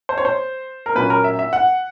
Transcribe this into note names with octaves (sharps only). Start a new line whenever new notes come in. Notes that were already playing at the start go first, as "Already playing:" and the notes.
C5
C#5
C5
A#4
A#2 F#3 A#3 C#4 B4
A#4
E5
E5
F#5